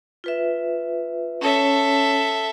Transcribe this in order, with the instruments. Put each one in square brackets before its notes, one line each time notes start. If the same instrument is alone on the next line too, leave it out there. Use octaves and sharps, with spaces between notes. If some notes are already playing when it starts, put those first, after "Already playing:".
[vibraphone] F4 B4 E5
[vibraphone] C#4 C#5 [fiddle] A4 E5